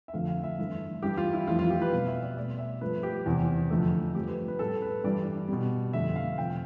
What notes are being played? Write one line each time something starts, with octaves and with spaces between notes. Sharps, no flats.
E5
F2 D3 F3 A3 F5
F5
E5
G2 E3 A3
G2 E3 G3 G4
F4
E4
F2 E3 A3 F4
F4
G4
B4
B2 G3 F5
E5
D5
B2 A3 D5
E5
G2 F3 A3 B4
G4
E2 C3 E3
F2 D3 F3 A3
G2 F3 A3 G4
B4
B4
B4
A2 G3 A4
B4
G2 E3 G3 D5
B2 G3
F2 D3 A3 E5
F5
F2 C3 F3 G5